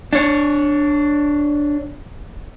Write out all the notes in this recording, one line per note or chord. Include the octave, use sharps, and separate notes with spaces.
D4 C#5